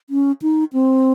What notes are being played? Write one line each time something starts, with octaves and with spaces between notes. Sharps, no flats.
C#4
D#4
C4